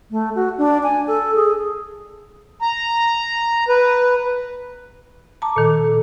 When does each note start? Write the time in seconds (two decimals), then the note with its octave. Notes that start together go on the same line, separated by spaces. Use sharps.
0.11 A3
0.35 F#4
0.58 D4
0.83 G#5
1.07 A4
1.36 G#4
2.62 A#5
3.69 B4
5.42 A5 A#5 D6
5.56 A#2 D#3 A4